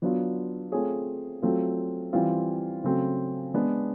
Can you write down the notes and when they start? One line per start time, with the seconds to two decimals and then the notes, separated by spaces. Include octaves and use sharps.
0.02 F#3 B3 D4 F4
0.72 A3 C4 F4 G#4 C#5
1.42 F#3 A3 C4 F4
2.13 E3 G3 C4 F4
2.84 C#3 F#3 A3 C4
3.54 G#3 B3 D4